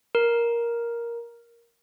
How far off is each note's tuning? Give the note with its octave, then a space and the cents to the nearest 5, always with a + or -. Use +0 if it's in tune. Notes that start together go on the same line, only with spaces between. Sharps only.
A#4 +10